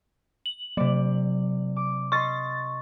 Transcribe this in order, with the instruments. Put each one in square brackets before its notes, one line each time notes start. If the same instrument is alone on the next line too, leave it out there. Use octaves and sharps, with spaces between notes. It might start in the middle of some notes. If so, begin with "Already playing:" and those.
[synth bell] F#7
[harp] C3 D5 [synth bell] F#3
[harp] D6
[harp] D#5 C6 [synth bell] C#6 A6